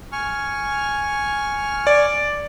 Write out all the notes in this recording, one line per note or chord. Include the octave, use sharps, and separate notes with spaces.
G#5 C#6 F6
D5